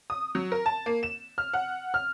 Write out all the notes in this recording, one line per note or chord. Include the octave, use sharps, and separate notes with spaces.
D#6
F#3
A#4
A5
A#3
E7
F6
F#5
F6